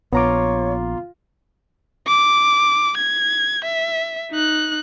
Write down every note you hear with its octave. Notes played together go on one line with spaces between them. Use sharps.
A#1 B3 F4 C#5 A#5 D6
D6
G#6
E5
D#4 F#6